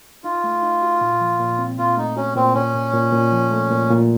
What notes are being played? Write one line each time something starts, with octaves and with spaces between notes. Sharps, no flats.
D#4 F4
A3
D#4
F#4
A#2
F3
A#2
C4
A#2 F4
A3 D#4
C#4 F#4
A#2 C4
A#2 C#4
A#2
A#2
A#2
F3
A3
A#2
A#2